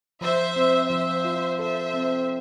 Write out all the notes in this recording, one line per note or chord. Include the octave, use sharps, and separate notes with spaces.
F3 C5 E5
C4
F3 C5 E5
F4
A4 C5 E5
C4